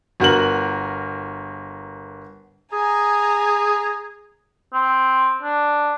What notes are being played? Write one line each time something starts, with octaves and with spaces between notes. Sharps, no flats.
G1 F#4 A#4 F#7
G#4 G#5 A#5
C4
D4